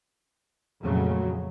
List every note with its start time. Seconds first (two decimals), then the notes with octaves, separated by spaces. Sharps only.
0.82 F2 A#2 C#3 F#3 A3